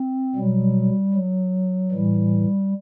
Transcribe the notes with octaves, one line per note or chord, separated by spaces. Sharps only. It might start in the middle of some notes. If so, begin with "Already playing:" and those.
Already playing: C4
B2 F#3 G3
F#3
A2 E3 G3